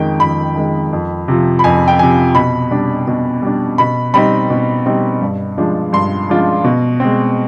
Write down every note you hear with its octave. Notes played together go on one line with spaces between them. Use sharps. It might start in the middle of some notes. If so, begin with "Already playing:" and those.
Already playing: F2 D#3 G#3 G5
F2 B5
D#3 G#3
F2
C3 F3
B5
F2 G#5
G5
C3 F3 G#5
B2 B5
G3 D4
B2
G3 D4
B2 B5
G3 C4 D#4 B5
B2
G3 C4 D#4
G2
F3 G#3 D4 F4
G2 C6
F3 G#3 D4 F4
B2
G#3 C4